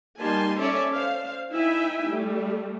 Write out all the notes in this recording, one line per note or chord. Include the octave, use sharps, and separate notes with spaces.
G3 A#3 D#4 G#5 A5 C6
C#4 A4 C#5 D5 E5 A5
C5 F5
D#4 E4 E5 G5 G#5
G3 A3